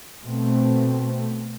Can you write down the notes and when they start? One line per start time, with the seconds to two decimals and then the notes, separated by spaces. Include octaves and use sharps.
0.24 B2 A3 C4